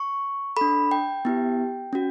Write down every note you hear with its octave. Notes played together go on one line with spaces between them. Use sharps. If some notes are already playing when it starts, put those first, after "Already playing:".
Already playing: C#6
D4 A4 B5
G5
B3 E4 G4
C#4 F#4